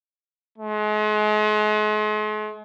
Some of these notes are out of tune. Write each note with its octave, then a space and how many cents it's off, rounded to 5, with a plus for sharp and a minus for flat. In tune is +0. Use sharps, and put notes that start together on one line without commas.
G#3 +40